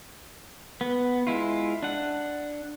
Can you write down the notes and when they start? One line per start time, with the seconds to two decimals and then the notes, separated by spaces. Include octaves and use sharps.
0.81 B3
1.27 G#3 E4 F4
1.83 D4 F#5